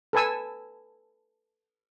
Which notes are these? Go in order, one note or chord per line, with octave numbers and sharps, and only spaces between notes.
A4 B4 G#5 E6